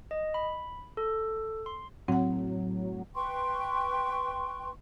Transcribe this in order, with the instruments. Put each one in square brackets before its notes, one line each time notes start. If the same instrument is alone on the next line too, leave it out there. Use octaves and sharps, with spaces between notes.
[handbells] D#5
B5
A4
C6
[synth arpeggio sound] A2 F#3 [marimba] C4 F#5
[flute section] B4 G5 C6 C#6